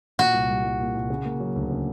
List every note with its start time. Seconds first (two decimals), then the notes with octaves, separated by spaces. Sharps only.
0.19 A#2 F#4
0.34 C2
0.49 G3
0.64 C2
0.80 A#2
0.95 C2
1.10 C#3
1.25 A#3
1.40 F#3
1.56 D2
1.70 C#3